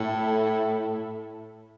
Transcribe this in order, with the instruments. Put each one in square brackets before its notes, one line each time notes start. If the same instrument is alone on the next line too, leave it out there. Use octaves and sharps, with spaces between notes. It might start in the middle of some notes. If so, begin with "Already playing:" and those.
Already playing: [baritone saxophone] A2 [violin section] E4 A4